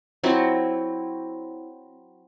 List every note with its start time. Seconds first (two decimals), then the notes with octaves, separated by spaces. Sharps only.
0.24 F#3 C4 E4